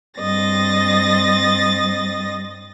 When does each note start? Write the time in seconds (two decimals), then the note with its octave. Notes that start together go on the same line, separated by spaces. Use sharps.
0.20 G2 C4 D#5 A6 A#6